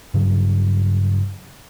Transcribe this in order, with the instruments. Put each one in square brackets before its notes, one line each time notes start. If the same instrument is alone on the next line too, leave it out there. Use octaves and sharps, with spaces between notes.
[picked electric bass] G2 C#3 F#3